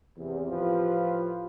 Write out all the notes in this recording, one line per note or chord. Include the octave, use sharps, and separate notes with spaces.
E2 C3
A2 F3 F4 G4 B4